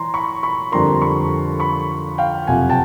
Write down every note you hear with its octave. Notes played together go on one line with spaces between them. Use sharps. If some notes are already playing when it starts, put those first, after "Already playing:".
Already playing: E3 A#5 C6
B5 C#6
B5 C#6
F2 D3 G3 A#3 A#5 C6
B5 C#6
B5 C#6
F5 G5
F#1 F2 C3 F3 F#5 G#5
G5 A5